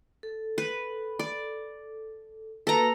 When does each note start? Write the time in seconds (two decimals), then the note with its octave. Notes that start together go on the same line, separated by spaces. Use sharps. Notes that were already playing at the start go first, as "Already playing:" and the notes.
0.23 A4
0.58 B4
1.19 D5
2.67 A#3 F#4 A4 B4 A#5